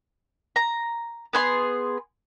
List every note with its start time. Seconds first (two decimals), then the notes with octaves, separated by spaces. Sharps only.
0.56 A#5
1.33 B3 G#4 C6